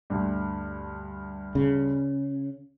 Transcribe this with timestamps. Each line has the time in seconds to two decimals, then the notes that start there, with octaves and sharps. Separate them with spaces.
0.10 D2 G2
1.55 C#3